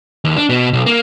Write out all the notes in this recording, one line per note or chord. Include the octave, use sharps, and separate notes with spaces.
D#2
D4
B2
B1
A#3